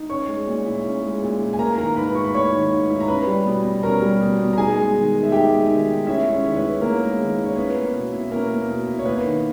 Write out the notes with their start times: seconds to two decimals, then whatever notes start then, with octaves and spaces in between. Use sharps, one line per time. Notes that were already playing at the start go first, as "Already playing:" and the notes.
Already playing: D#4
0.10 C#4 C#5 C#6
0.28 G#3
0.47 A#2
0.66 E4
0.84 C#4
1.03 G#3
1.22 A#2
1.40 E4
1.53 G#5
1.59 A#3 A#4 A#5
1.78 D#3 A#4 A#5
1.96 G#2 B4 B5
2.15 E4 C#6
2.25 B5
2.34 A#3 C#5 C#6
2.52 D#3
2.71 G#2
2.90 E4
3.00 A#5
3.08 C#4 B4 B5
3.27 G3
3.46 B2
3.65 B2
3.83 C#4 A#4 A#5
4.02 G3
4.20 B2
4.38 B2
4.53 A#5
4.57 D#4 G#4 G#5
4.76 G#3
4.95 D#3
5.14 D#3
5.23 E5
5.32 D#4 G4 G5
5.51 G#3
5.70 D#3
5.88 D#3
6.07 C#4 E4 E5
6.26 G#3
6.32 C#4 C#5
6.44 D#3
6.53 C#5
6.57 B3 B4
6.63 E4
6.81 A#3 C#4 A#4
7.00 G#3
7.19 D#3
7.38 E4
7.45 C#5
7.56 B3 C#4 B4
7.75 A#3
7.94 B2
8.12 E4
8.31 A#3 C#4 A#4
8.50 A#3
8.68 B2
8.87 E4
8.99 C#5
9.05 A#3 B3 B4
9.24 D#3